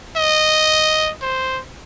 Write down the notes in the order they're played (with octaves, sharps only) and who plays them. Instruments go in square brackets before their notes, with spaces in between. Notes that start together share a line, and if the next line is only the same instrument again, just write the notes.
[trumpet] D#5
C5